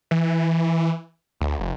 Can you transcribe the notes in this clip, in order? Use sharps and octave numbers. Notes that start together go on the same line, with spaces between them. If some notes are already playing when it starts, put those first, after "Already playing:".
E3
D2
F1